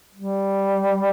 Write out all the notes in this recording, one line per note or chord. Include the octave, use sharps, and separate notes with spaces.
G3